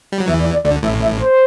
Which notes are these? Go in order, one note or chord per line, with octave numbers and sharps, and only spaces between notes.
G3
F#3
E2 E3 E5
D5
D5
D2 D3 D5
A1 A2 E5
E5
C5